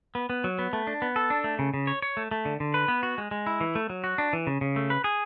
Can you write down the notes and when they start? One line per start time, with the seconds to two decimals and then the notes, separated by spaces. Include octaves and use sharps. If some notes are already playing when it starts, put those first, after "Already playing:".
0.15 B3
0.30 B3
0.44 F#3
0.59 B3
0.73 A3
0.87 D4
1.02 B3
1.16 A4
1.30 D4
1.44 A3
1.59 C#3
1.74 C#3
1.87 C#5
2.02 C#5
2.17 A3
2.31 A3
2.45 D3
2.60 D3
2.74 B4
2.88 B3
3.03 F#4
3.18 G#3
3.31 G#3
3.47 E4
3.61 E3
3.75 A3
3.90 F#3
4.04 F#4
4.18 D4
4.33 E3
4.47 C#3
4.61 C#3
4.76 A3
4.90 B4
5.04 G#4